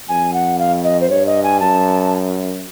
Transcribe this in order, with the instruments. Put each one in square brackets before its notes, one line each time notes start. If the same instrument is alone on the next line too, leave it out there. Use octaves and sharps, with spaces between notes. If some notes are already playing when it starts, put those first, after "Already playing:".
[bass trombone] F2 [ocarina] G#5
[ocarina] F#5
F5
D#5
C5
[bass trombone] G2 [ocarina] C#5
[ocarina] D#5
G#5
[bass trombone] F#2 [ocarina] A5